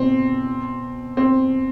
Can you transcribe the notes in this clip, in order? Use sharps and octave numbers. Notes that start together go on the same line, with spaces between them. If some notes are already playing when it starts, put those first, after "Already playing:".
Already playing: B2 C4
C4